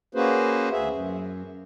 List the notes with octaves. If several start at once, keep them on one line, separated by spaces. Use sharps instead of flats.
A#3 C#4 F#4 G#4 B4 C5
D2 G#4 E5
F#2